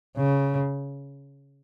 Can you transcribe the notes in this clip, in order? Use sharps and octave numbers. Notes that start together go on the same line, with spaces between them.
C#3